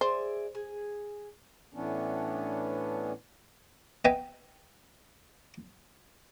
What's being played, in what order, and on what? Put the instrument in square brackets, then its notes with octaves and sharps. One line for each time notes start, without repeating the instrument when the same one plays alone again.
[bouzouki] G#4 D5 E5 [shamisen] C5
[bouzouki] G#4
[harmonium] A2 E3 B3 C#4 D4
[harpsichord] B3 B4 D#5 E5 G5 G#5